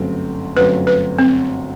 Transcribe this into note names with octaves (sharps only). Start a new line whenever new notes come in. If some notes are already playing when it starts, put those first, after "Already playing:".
Already playing: G1 F#2 F#3 A3 C4
G1 F#2 F#3 A3 C4 B4
B4
C4